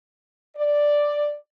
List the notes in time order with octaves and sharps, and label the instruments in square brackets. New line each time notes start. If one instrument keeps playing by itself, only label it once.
[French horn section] D5